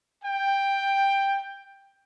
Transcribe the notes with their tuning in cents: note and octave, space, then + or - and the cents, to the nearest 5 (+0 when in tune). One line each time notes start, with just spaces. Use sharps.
G5 +10